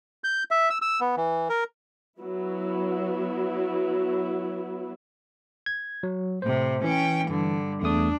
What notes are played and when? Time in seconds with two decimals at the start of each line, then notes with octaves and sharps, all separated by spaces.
0.24 G6
0.51 E5
0.70 E6
0.82 E6
1.01 B3
1.17 E3
1.49 A#4
2.21 F#3 B3 E4
5.66 G#6
6.03 F#3
6.42 A2 C3 C5
6.84 E3 C#4 G5
7.28 G2 D3
7.82 E2 A3 D4 D#6